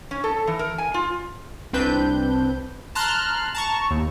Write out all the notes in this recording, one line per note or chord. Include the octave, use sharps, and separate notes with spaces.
C#4
A4
E3
A#4
G#5
F4
C2 C4 D4 B4 G6
A5 A#5 C6 F6 F#6
A5 A#5 C#6
D#2